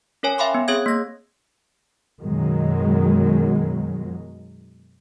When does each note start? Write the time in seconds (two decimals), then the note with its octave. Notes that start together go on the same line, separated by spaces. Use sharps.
0.23 C#4 A#4 C#5 G#5
0.38 E5 F5 G5 B5 C6 D6
0.55 B3
0.68 C4 G#4 C#5 D#6 G#6
0.86 A#3 A#6
2.21 F#2 B2 D#3 F#3 G#3